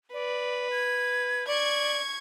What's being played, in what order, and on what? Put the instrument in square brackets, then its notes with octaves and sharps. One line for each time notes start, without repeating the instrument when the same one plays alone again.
[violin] B4 [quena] D5
[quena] G#6
[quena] D5 [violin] C#6 G#6